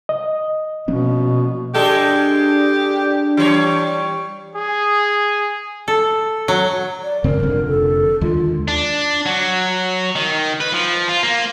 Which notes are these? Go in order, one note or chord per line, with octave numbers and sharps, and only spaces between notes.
D#5
B2 F3 A#3 C#4
G#3 D4 G4 A4
E3 G3 C#5
G#4
A4
F#3
D5
F#2 C#3 C4 A#4
F1 F2 D3
A4
D#2 D3 G#3 F4
D4
F#3
D#3
B4
F3
F4
A#3